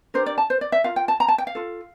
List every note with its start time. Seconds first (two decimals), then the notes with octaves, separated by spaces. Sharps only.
0.14 D4 G4 A#4 C5
0.26 D5
0.38 A5
0.50 C5
0.61 D5
0.72 E5
0.84 F4 A#4 F5
0.96 G5
1.08 A5
1.20 A#5
1.28 A5
1.38 G5
1.47 F5
1.55 F4 A4